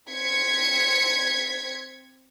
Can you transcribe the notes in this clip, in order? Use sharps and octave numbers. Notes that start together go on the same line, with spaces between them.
C4 G#6 B6 C#7